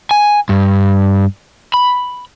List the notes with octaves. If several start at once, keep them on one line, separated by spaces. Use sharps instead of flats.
G#5
G2
B5